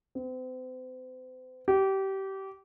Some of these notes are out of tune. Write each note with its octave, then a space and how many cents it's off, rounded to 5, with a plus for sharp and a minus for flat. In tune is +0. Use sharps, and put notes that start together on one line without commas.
C4 -40
G4 -25